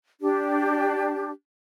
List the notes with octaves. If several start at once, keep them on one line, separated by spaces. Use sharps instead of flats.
D4 G4